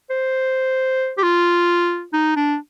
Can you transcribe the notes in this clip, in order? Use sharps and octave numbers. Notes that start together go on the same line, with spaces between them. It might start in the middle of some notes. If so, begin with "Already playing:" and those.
C5
G4
F4
D#4
D4